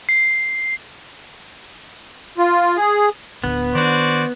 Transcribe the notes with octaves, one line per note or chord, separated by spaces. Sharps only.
C7
F4
G#4
D1 G1 D3 B3
D#3 D4 F#4 C5 D5